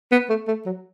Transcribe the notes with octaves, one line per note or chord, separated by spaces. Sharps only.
B3
A3
A3
F#3